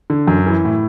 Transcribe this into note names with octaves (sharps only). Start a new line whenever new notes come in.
D3
F#2
E3
A2